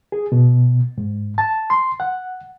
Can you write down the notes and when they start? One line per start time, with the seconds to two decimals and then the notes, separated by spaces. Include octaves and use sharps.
0.12 G#4
0.32 B2
0.98 G#2
1.38 A5
1.70 C6
2.00 F#5